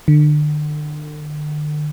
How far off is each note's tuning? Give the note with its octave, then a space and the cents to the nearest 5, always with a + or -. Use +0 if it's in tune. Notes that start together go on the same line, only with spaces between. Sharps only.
D3 +35